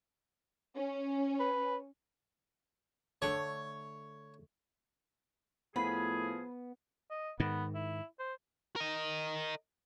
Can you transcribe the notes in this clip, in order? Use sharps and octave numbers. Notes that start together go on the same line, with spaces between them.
C#4
B4
D3 A3 C#5
A2 F3 B3 G#4 B4 B5
D#5
G#2 D#3 B3
E4
C5
A#4 D#5